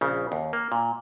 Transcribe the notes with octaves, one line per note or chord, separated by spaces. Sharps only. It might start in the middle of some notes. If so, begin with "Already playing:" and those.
A#1 C#3
D#2
A#3
A#2